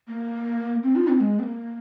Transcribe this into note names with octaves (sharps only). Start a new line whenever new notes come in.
A#3
C4
F4
C4
G#3
C4
A#3